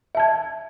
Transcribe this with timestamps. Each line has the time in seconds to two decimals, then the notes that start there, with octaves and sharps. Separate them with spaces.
0.15 E5
0.17 A5
0.20 G#6